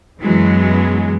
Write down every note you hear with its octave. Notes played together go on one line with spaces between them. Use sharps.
F#2 B2 E3 F#3 G#3